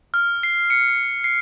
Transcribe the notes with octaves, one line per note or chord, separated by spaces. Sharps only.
F6
C7
C#7
C7